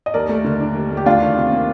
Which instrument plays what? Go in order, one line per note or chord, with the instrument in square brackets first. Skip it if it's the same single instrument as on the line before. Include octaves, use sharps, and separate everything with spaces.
[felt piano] D#5
[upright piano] D#2 [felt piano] A#4 D5
[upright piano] A3
D3
D4
D#2
A3
[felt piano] G4
[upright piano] D2 [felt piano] D4 F4
[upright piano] D#3
C3
A#3